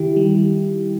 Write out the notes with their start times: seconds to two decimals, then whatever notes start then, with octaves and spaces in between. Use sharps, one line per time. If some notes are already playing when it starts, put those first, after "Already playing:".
Already playing: D#3 E4 G4
0.16 G3